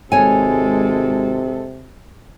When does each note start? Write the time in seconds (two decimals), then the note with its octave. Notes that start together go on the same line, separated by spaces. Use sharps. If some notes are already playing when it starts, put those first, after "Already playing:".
0.12 G#1 C3 G#3 A4 C#5 G#5